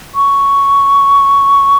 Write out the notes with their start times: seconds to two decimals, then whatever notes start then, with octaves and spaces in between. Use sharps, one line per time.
0.15 C#6